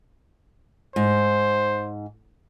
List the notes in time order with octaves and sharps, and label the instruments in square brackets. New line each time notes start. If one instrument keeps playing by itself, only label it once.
[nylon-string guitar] G#2 [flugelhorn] C5